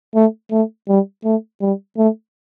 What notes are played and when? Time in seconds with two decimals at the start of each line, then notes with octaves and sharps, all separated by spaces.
0.15 A3
0.51 A3
0.88 G3
1.24 A3
1.61 G3
1.97 A3